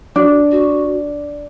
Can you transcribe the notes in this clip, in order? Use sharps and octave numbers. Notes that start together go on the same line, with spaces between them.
D4 F#4
F#4